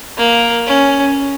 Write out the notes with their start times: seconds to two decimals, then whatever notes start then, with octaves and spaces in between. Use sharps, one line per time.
0.17 A#3
0.67 C#4